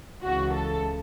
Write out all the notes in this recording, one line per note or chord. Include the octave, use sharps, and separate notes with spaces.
C#2 C#3 E3 F#4
A4